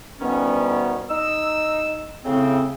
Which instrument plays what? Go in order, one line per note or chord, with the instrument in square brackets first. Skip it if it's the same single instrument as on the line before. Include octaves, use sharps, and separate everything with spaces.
[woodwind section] D2 B2 D#3 G3 B3 C#4
D#4 E6
A2 C#3 C4